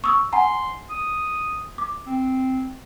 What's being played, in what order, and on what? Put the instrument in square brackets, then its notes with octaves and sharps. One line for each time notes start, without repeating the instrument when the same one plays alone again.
[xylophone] C#6 D#6 E6
[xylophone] F#5 G#5 A#5 [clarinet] C6
[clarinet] D#6
[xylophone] D6
[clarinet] C4